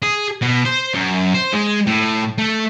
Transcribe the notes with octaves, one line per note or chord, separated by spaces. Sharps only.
G#4
B2
C5
F#2
C5
G#3
A2
A3